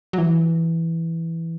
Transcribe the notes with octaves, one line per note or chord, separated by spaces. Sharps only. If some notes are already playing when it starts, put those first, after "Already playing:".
F#3
E3